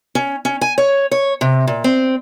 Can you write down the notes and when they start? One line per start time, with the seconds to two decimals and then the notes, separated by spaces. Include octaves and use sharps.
0.15 C#4
0.45 C#4
0.61 G#5
0.78 C#5
1.11 C#5
1.41 C3
1.67 A#2
1.84 C4